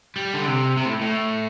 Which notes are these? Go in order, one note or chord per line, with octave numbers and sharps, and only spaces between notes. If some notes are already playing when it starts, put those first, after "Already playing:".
G3
D3
C3
C3
A2
A2